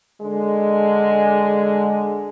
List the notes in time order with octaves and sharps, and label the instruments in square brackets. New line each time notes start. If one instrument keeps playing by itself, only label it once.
[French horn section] D3 G#3